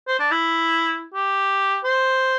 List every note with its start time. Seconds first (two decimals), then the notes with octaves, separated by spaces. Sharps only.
0.08 C5
0.19 D4
0.31 E4
1.14 G4
1.84 C5